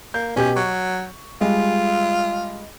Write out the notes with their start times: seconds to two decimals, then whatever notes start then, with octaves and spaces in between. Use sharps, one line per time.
0.14 A#3 G6
0.36 B2 C#4 G4 G6
0.56 F#3 C#6
1.41 G3 G#3 F4